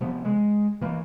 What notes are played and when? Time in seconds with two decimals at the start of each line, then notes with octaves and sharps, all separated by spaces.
0.01 C3 F3 B3
0.25 G#3
0.81 E3 A#3